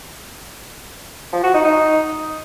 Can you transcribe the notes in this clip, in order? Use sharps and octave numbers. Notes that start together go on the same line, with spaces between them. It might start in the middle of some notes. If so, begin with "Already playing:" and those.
F3
F#4
D#4
D#4